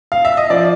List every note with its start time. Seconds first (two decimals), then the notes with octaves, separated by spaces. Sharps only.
0.12 F5
0.25 E5
0.37 D#5
0.50 F3 D5